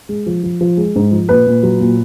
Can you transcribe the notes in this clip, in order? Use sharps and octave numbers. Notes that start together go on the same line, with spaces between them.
G#3
F3
F3
F3
G#3
G#2
F3
A#2 B4
A#2
F#3
A#2